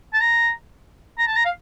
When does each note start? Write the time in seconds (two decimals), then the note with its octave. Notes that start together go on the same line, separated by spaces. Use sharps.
0.14 A5
0.21 A#5
1.18 A#5
1.27 A5
1.36 A#5
1.45 F5